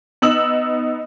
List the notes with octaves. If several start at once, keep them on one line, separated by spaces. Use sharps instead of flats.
B3 D#4 E6 F#7